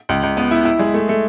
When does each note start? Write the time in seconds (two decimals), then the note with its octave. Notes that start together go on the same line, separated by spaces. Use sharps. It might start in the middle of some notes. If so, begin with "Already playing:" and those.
0.09 C#2
0.23 C#2
0.37 B3
0.51 E4
0.65 E4
0.79 G#3
0.94 A3
1.09 A3